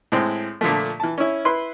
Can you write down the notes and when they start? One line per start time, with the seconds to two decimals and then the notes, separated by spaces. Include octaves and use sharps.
0.12 A2 G#3 C4
0.61 A#2 D3 F3 A3
1.00 E3 A5
1.18 C#4 E4
1.45 E4 B4 C6